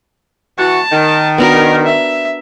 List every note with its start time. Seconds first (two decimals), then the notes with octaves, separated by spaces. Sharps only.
0.59 E3 F#4 A5
0.92 D#3
1.38 B3 D4 F#4 A#4
1.86 E5